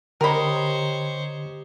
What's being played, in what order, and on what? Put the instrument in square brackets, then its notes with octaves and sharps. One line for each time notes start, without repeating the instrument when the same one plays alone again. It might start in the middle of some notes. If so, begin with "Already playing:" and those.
[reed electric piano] D3 A#5 [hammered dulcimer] G4 D#5 [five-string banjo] A#4 B5 [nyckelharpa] C5 C#5